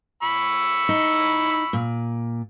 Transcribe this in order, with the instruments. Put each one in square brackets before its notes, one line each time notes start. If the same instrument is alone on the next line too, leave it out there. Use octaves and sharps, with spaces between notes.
[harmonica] B5 C#6 E6
[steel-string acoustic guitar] D#4
A#2